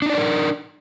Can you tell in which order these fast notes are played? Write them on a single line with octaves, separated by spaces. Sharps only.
D4 D#4 D5 B4 A#4